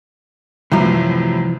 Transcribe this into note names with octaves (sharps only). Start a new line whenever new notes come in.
C2 F#2 A2 C3 E3 F3